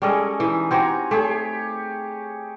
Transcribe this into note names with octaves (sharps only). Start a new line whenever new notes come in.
G3 G#3 C#4 G#4 A4 D#5
E3 D#4
C4 F#4 G4 C5 G#5 A#5
A3 G4 G#4 C#5